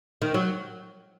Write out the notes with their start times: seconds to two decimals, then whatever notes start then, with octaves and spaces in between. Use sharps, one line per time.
0.22 D#3
0.34 F#3